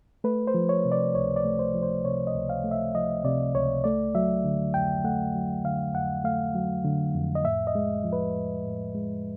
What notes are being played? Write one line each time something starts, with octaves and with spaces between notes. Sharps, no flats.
A3 B4
C5
F3
C#5
C3
D5
C#2 C#5
D5
A3
C5
F3
C5
C3 C#5
D#5
C#2
F5
A3
E5
F3 D#5
C3 D5
C#2 C#5
A3 D5
F#3 E5
D3
F2 G5
A3 F#5
F#3
D3 F5
F2 F#5
A3 F5
F#3
D3
F2
D#5
A2 E5
D#5
G#3
F3
B4
A2
A2
G#3